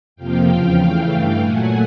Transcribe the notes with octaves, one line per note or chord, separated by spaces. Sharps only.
F2 C3 F3 A#3 F5 G5
E2 C#3 F3
C#3 E3 A3 F5 G5
G2 E3 A3
A#2 F#3 A3 F#5 G#5